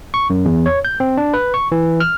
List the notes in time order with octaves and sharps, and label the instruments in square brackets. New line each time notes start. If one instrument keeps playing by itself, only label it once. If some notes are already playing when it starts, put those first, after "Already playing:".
[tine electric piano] C#6
F#2
E2
C#5
G6
C4
D4
B4
C#6
E3
F6